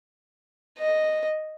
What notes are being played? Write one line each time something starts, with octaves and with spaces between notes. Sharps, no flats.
D#5